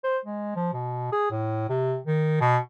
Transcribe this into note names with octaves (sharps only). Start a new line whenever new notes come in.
C5
G#3
F3
B2
G#4
A2
C3
D#3
B2